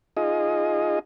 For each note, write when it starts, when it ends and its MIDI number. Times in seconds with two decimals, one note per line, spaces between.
0.17 0.99 63
0.17 0.99 65
0.17 0.99 68
0.17 0.99 75